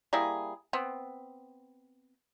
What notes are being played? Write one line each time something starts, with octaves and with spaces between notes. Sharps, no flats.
G3 A#3 E4 G#4
B3 C4